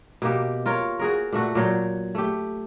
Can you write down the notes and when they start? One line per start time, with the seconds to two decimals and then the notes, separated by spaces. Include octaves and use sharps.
0.22 B2 A#3 G4
0.66 F4 A#4 C#5
0.99 F#4 G#4 A#4
1.33 A#2 A3 F#4
1.55 A#2 F#3 G5
2.15 A3 G4